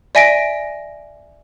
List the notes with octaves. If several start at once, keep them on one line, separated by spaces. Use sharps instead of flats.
D5 E5 G#5 A#6 B6 D7